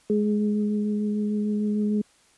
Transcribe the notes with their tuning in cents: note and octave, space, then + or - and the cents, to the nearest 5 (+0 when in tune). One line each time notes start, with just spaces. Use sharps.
G#3 +15